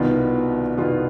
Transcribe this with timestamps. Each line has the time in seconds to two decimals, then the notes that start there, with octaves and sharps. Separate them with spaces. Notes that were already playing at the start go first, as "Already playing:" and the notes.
Already playing: C2 B2 D#3 B3 F4
0.77 C2 B2 D#3 B3 F4